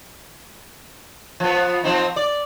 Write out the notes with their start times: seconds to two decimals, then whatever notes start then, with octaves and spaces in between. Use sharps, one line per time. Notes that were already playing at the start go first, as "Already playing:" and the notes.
1.40 F3 B3
1.84 F3 C4 D#4
2.16 D5